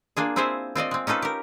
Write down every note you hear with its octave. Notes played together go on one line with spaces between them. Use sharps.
A#3 D4 F4 G#4
C4 E4 F4 G#4 C5 E5
C4 F4 D5 D#5
G#3 C4
C#4 D#4 F4 A4 B4
G4 A#4